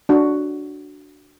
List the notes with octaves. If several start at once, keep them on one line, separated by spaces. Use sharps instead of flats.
D4 F#4